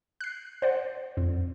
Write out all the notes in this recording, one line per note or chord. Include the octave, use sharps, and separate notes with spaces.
F#6 C7
C5 D5 F#5
F2